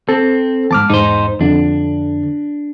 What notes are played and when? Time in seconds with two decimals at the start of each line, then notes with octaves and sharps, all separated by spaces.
0.09 C4 A4
0.71 E2 G#2 A5 D6 F6
0.90 E2 G#2 D#4 C5
1.41 F2 D3 D4